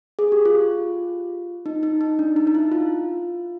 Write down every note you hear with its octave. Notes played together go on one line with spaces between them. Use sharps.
G#4
G4
F4
D#4
D#4
D#4
D4
D#4
D#4
E4
F4